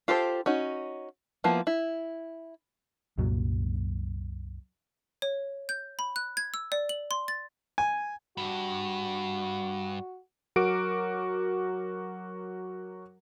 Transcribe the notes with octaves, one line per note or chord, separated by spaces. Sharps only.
F4 G4 A4 C5
C#4 D#4 F#4
F3 A#3 B3 E4
E4
C2 F#2 A#2 F#3
C#5
G6
B5
F#6
G#6
E6
D5
F#7
C6
A6
G#5
G2 F#4
F#3 F#4 A#4 D6 D7